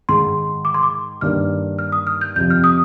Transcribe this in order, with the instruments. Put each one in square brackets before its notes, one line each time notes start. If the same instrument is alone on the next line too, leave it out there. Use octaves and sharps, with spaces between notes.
[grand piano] G#2 D#3 G#3 [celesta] C6
[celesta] D6
C6
D6
[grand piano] G2 D#3 A#3 D4 [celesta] F6
[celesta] F6
D#6
F6
G6
[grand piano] F2 C3 F3 [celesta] G6
[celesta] F6
D#6